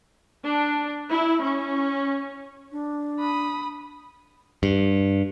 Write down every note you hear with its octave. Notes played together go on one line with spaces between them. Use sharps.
D4
E4
C#4
D4
B5 D#6
G2